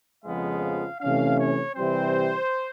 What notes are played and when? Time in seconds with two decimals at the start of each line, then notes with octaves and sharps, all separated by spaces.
0.25 F2 C#3 F3 G#3 B3 F5
1.00 C3 E3 A3 C#4 F5
1.38 C#5
1.76 C3 E3 G3 C4 C5